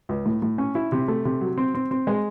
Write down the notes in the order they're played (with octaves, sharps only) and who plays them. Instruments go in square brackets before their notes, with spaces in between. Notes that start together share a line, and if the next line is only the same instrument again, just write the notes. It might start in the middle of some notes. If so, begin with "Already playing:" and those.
[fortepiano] C#2
A2
A2
C#4
E4
C3
A3
C3
F#3
C4
C4
C4
G#3